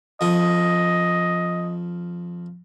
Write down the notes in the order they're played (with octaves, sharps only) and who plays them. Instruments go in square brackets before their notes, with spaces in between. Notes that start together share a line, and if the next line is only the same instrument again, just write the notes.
[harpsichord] F2 F3 D#6 [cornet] D#5